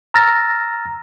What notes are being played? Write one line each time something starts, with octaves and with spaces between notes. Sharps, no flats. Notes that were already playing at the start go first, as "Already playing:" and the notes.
A#5 E6 F6 A6 A#6